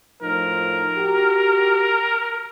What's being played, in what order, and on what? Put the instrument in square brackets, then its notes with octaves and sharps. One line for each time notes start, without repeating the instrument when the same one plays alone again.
[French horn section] A2 F3 D#4 [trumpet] A#4
[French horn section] F#4 G4